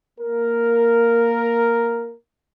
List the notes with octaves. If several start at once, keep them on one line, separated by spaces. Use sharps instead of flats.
A#3 A#4